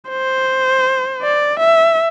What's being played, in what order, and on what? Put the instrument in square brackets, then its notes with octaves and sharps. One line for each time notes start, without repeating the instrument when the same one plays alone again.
[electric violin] C5
D5
E5